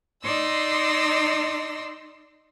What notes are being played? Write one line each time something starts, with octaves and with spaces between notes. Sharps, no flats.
D#4 D5 C6 E6 A#6